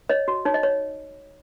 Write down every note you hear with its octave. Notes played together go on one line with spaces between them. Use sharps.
C#5 D#5
F#4
D#4 C#5
D#5
C#5